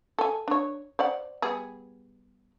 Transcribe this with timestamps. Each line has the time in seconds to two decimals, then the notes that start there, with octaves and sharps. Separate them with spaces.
0.19 A4 G#5
0.48 D4 C#5
0.99 C5 D5 F#5
1.42 G3 B3 G#4